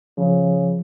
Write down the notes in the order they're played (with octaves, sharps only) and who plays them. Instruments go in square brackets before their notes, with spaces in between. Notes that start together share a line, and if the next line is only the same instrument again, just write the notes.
[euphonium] C#3 [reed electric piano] F3